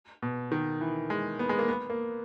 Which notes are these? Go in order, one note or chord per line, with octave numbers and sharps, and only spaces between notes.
B2
D#3
E3
G#3
B3
G#3
A#3
B3
A#3